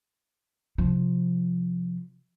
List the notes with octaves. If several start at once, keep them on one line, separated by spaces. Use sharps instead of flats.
C3 F3